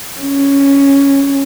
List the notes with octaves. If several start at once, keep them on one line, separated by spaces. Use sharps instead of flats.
C#4